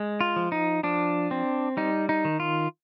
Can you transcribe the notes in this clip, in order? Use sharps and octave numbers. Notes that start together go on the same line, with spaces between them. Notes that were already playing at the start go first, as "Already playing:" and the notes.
Already playing: G#3
F4
F3
D#4
F3 D4
C4
G3 D#4
D#4
D#3
F4